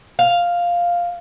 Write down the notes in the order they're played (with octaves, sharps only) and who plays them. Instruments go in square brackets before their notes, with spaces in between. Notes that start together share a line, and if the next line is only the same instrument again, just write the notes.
[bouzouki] F5